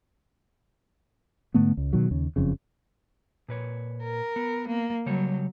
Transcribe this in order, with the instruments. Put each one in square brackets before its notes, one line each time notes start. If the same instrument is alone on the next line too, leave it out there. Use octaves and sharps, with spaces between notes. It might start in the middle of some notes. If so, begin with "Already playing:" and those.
[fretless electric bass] G#2 D3 A3 B3
C#2
B2 D#3 F#3
D#2 C#3
F#1 F2 C#3
[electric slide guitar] A#2 B4 C#5
[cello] A#4
[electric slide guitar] B3
[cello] A#3
[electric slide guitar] C#3 G3 C#5 [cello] F#3